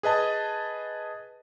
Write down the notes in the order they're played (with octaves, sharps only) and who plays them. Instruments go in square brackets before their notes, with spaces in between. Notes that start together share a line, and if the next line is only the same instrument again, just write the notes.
[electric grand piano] G#4 B4 D#5 A5